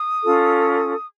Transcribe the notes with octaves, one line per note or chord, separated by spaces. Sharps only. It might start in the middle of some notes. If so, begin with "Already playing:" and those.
Already playing: D#6
C#4 F4 A4